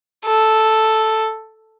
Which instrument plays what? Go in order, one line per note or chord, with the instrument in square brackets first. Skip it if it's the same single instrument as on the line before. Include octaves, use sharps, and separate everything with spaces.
[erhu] A4